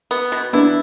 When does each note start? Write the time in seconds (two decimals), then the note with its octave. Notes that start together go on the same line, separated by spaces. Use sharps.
0.11 B3
0.32 B2
0.53 B3 D4 E4